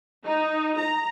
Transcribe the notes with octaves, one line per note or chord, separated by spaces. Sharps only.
D#4
A#5